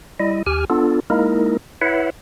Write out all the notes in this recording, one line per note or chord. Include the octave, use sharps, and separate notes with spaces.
G3 E4 D#5
D#2 G4 G#5 F6
B3 D4 F4 A4
G#3 A#3 D#4 E4 A#4
E4 B4 C#5 E5 F#5